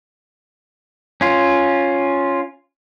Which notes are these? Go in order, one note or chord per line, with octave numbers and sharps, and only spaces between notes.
C#4 F4